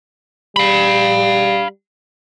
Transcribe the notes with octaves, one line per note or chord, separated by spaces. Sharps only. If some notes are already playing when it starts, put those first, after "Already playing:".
G3 F5 B5